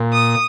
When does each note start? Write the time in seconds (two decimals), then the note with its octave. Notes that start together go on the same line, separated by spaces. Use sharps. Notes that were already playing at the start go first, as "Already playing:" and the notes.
Already playing: A#2
0.13 D#6